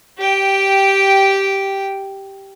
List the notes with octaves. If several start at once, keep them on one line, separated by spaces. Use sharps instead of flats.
G4 G5